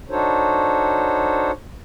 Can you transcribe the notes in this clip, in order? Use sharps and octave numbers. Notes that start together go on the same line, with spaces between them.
D4 D#4 F#4 A4 C5 C#5